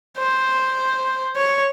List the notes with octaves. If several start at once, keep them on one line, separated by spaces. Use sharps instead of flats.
C5
C#5